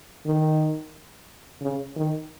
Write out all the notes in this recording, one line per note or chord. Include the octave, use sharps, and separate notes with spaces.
D#3
C#3
D#3